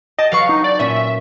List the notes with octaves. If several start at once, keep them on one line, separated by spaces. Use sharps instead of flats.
G4 D#5 A5
F#3 B4 F5 C#6
D#4
D5
A#2 C#4 E5